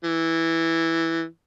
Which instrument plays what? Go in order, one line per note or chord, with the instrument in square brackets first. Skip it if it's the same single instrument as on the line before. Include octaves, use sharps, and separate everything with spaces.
[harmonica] E3